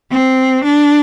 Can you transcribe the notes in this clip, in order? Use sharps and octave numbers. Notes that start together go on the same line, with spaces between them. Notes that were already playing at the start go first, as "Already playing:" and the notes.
C4
D4